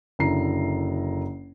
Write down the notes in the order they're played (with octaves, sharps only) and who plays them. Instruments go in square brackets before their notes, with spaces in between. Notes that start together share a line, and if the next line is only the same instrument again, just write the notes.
[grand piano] F#1 D3 E4 A#5 C7